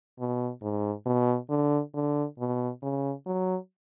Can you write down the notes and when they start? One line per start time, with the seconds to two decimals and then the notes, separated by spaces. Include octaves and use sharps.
0.19 B2
0.62 G#2
1.06 B2
1.50 D3
1.94 D3
2.39 B2
2.82 C#3
3.26 F#3